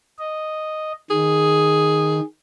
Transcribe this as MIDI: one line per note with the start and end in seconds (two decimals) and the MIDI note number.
0.19 0.92 75
1.10 2.20 51
1.10 2.23 68